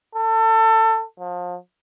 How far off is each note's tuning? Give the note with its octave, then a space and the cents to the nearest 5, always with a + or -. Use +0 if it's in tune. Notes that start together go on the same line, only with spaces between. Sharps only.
A4 +25
F3 +30